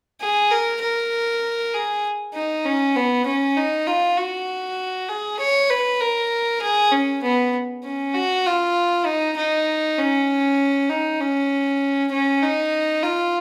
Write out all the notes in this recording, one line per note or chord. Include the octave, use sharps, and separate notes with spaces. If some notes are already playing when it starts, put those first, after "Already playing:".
G#4
A#4
A#4
G#4
D#4
C#4
B3
C#4
D#4
F4
F#4
G#4
C#5
B4
A#4
G#4
C#4
B3
C#4
F#4
F4
D#4
D#4
C#4
D#4
C#4
C#4
D#4
F4